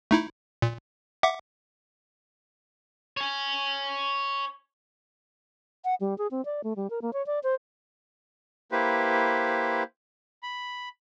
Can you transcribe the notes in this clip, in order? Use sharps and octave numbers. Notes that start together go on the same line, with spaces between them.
A3 D#4 E4
A#2
E5 F#5 D6
C#5 G#5
F#5
G3
G#4
C4
D5
A3
G3
A#4
A#3
C#5
D5
C5
A#3 E4 G4 B4 C5
B5